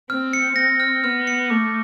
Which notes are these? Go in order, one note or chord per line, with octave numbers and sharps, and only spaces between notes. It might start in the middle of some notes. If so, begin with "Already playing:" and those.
C4 F6
C#7
C4 A#6
F6
B3 F6
C#7
A3 D6